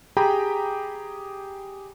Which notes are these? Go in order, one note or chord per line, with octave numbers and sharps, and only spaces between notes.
G4 G#4 G5 A#5 B5 D#6